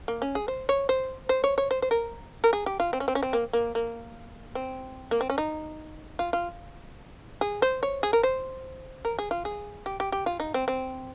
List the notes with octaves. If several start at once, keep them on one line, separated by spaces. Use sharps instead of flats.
A#3
C#4
G#4
C5
C#5
C5
C5
C#5
C#5
C5
C5
A#4
A#4
G#4
G4
F4
C4
C#4
C4
C#4
C4
A#3
A#3
A#3
C4
A#3
C4
C#4
D#4
F4
F4
G#4
C5
C#5
G#4
A#4
C5
A#4
G#4
F4
G#4
G4
G4
G4
F4
D#4
C4
C4